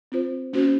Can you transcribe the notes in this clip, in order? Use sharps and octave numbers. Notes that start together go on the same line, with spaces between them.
C4 F4 C5
A#3 C#4 F#4 C5